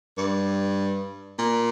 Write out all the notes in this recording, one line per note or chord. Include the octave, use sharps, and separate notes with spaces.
G2
A#2